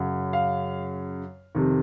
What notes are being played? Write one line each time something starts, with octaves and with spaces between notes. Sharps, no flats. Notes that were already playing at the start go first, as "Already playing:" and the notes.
Already playing: F#2 C#3
F5
F2 C3 D#3